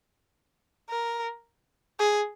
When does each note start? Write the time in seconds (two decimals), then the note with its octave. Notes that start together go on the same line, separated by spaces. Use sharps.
0.89 A#4
1.99 G#4